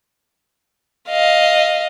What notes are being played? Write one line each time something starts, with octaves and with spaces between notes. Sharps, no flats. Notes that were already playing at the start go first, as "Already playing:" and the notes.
D#5 F5